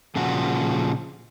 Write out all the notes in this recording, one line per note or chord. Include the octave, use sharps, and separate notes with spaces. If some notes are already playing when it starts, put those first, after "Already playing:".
A#2 C#3 F3 F#4